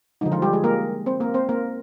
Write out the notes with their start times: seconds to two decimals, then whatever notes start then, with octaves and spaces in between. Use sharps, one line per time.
0.21 F3 G#3 D#4
0.26 D3
0.32 F3 F4
0.42 G3 G4
0.53 G#3 G#4
0.64 A#3 A#4
1.06 C4 C5
1.20 A#3 A#4
1.34 C4 C5
1.49 A#3 A#4